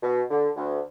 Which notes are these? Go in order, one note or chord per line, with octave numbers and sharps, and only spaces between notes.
B2
D3
D2